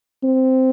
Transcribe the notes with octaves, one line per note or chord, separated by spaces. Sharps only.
C4